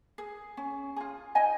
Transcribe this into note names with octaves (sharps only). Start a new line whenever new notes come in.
G#4
C#4
F4 G#4
D#4 D#5 G#5